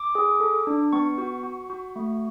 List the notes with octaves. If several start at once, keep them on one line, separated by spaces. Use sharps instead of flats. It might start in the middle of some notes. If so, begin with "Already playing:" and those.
Already playing: D6
G#4
A4
D4
B3 C#6
F#4
F#4
F#4
A3